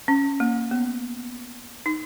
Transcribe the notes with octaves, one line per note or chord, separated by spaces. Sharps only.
C#4
A#3
B3
D#4